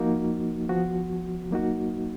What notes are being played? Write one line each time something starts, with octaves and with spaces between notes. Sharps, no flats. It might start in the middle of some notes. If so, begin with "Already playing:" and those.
Already playing: F3 A#3 D#4 F#4
F3 B3 F#4
F#3 A#3 D#4 F#4